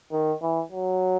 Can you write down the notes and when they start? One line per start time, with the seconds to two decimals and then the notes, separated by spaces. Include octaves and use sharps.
0.12 D#3
0.42 E3
0.71 F#3